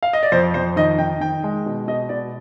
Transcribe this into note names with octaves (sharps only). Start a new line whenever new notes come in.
F5
D#5
D5
F2 C5
F2 C5
D#3 D#5
D#3 G5
D#3 G5
G#3
B2
B2 D#5
B2 D5